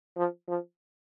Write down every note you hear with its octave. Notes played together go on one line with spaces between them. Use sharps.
F3
F3